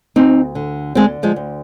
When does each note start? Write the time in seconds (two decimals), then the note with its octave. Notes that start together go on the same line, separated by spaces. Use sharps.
0.16 D2 C4 D#4
0.55 D3
0.95 D3 G#3 C4
1.23 F3 G#3
1.36 D2